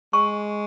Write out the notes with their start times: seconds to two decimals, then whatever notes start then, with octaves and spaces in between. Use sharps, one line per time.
0.13 G#3 C#6